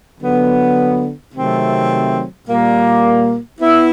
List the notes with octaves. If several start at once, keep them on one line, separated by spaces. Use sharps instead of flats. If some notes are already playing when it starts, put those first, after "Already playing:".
D3 F#3 B3
C3 D#3 F#3 A3 C4
A#2 G3 A#3
B3 E4